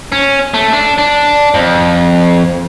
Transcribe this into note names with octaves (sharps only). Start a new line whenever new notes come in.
C#4
A3
D4
D4
F2